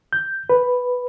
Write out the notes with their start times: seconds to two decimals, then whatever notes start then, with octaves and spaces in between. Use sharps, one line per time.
0.13 G6
0.49 B4